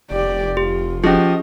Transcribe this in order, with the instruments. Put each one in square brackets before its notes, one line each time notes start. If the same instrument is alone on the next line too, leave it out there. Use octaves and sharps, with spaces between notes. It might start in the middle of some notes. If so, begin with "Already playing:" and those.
[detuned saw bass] F1 [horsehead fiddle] G4 D5
[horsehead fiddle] F4 [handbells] G4
[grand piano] F3 G4 [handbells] C#4 G#4 [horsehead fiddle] D#5